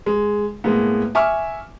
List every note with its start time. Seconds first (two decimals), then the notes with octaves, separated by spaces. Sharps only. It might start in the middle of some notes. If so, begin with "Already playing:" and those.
0.06 G#3
0.64 A2 G#3 A#3 B3
1.15 E5 G#5 C#6 D6 F6